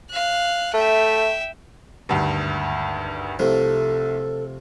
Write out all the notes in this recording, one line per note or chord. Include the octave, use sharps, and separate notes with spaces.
F5 F#6
A3 E5 G5
G#1 D2 G2
C2 C3 F3 A3 A4